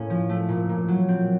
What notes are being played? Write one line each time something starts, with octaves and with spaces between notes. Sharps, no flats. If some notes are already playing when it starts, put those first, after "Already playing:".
Already playing: A2 A#3 C#4
F3
A3
A#2
A#2
F#3
C4